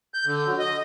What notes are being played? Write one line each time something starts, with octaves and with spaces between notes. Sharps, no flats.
G6
D3
F#3
D#5